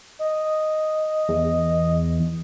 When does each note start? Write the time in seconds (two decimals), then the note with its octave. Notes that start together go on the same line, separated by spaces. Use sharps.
0.19 D#5
1.29 E2